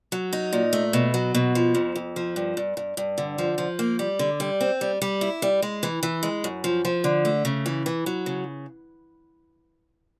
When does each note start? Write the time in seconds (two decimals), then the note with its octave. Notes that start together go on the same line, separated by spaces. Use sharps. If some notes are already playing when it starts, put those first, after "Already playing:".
0.12 F#3
0.33 D#4
0.53 A#2
0.73 A3
0.93 B2
1.14 F#3
1.35 B2
1.55 F3
1.75 F2
1.95 F2
2.16 F3
2.36 G2
2.57 G2
2.77 G2
2.97 G2
3.18 D3
3.38 F3
3.58 F3
3.79 A#3
3.99 G3
4.19 D3
4.40 G3
4.61 C4
4.81 G3
5.02 G3
5.21 E4
5.42 G3
5.62 G#3
5.83 E3
6.03 E3
6.23 G#3
6.44 F#2
6.64 F3
6.85 F3
7.04 D3
7.25 A3
7.45 C#3
7.66 E3
7.86 E3
8.06 F#3
8.26 C#3